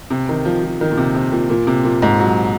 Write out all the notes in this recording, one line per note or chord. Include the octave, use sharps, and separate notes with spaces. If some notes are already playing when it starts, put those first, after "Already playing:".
C3
D#3
F3
F3
D#3
A#2
C3
C3
A#2
A#2
C3
A#2
G#2
F#3